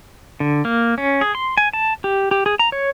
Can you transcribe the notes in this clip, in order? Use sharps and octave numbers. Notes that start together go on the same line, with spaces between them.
D3
A#3
C#4
G#4
C6
G#5
A5
G4
G4
G#4
A#5
C#5